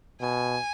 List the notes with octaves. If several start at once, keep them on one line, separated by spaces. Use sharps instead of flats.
B2 G#5